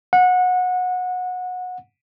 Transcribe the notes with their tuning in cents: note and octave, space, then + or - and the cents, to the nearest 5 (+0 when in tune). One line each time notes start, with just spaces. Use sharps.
F#5 -25